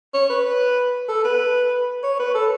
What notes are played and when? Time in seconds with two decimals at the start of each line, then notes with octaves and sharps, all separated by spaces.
0.14 C#5
0.30 B4
1.09 A4
1.24 B4
2.04 C#5
2.19 B4
2.35 A4